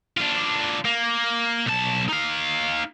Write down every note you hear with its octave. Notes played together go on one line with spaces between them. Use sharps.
D4 F4
A#3
B1 A5
D#4 F5